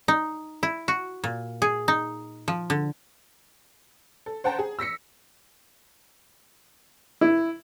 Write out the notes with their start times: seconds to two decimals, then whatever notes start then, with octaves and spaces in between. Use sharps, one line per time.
0.08 D#4
0.63 E4
0.88 F#4
1.24 A#2
1.62 G#4
1.88 D#4
2.48 F3
2.70 D3
4.26 A4
4.44 C5 F#5 G5 A5 A#5
4.59 G#4
4.79 E6 A#6 B6 C#7
7.21 E4